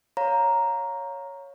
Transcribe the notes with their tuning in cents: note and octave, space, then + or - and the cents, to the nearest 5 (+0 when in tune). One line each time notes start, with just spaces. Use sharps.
C#5 +0 F5 +20 A#5 +0